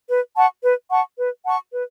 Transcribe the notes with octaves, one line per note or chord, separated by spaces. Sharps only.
B4
F#5 A5 C#6
B4
F#5 A5 C#6
B4
F#5 A5 C#6
B4